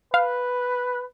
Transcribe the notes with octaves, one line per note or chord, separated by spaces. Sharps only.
B4 F5